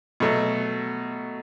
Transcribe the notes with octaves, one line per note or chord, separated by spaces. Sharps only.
B2 F#3 A3